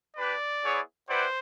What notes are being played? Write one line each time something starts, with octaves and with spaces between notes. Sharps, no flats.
D4 G4 B4 D5
B3 E4 G#4 C#5
E4 G4 B4 C5 D5 F#5